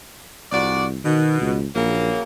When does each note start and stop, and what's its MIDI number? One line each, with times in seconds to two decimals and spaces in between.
0.52 0.98 36
0.52 0.84 41
0.52 0.84 66
0.52 0.84 74
1.04 1.56 47
1.04 1.39 51
1.41 1.67 37
1.75 2.12 34
1.75 2.22 49
1.75 2.22 54
1.75 2.22 58